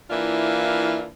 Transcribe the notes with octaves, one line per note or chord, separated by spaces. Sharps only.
E3 A#3 D4 E4 F4